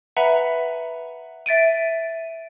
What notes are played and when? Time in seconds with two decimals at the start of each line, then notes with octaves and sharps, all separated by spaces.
0.17 B4 E5 F#5 G#5 A#5 B5
1.46 E5 A6 D7 D#7